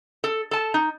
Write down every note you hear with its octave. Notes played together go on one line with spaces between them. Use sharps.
A4
A4 A5
D#4